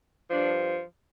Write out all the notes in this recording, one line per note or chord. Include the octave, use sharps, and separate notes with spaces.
G2 F3 D4